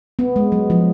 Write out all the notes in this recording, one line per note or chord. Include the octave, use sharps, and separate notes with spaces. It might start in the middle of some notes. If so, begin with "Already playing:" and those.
B3
G#3
F#3
F3